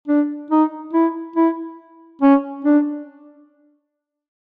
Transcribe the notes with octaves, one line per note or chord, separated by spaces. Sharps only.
D4
D#4
E4
E4
C#4
D4